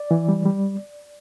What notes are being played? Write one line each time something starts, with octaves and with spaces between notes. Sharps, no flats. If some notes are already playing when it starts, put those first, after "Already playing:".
Already playing: D5
E3
G3
G3